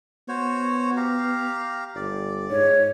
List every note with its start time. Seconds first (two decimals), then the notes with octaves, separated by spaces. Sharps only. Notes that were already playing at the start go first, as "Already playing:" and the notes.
0.28 B3 F#4 C5 C#5
0.97 G4 F5 A#5
1.96 G1 D5
2.51 G#2 C#5